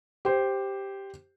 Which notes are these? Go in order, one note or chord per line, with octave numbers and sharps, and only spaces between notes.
G4 C5